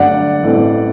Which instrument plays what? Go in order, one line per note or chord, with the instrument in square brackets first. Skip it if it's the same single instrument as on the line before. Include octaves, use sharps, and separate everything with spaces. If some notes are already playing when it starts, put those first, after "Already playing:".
Already playing: [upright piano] G2 D3 F#3 A3 D4 [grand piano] D5 F#5
[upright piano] A1 A2 A3 C4